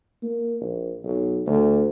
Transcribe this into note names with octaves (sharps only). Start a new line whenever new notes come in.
A#3
A#1
B1
D2